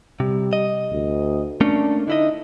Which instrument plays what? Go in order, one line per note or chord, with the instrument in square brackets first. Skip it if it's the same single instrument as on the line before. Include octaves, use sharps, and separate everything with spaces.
[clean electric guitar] C3 [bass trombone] G3
[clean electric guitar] D#5
[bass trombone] D2
[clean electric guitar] A3 A#3 C#4 [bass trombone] D4
[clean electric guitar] D3 E4 D#5 [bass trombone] D#4